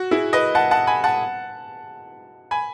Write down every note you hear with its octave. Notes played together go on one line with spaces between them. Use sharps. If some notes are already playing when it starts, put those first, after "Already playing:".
Already playing: F#4
E4 G#4
B4 D#5
F#5 A5
F#5 A5
G#5 B5
F#5 A5
G#5 B5